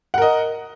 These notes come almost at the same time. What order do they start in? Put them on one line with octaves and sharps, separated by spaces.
F#5 A#4 D#5